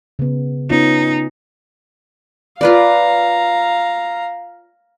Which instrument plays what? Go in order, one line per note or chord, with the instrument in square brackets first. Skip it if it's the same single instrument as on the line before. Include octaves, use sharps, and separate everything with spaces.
[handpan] C#3 B3
[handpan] B3 C#4 F4 [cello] D#4
[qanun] F4 B4 D5 [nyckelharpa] F5 A#5